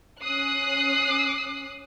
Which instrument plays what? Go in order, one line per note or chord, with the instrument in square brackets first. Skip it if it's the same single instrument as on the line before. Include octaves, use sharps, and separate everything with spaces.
[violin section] C#4 D#6 F#6 C7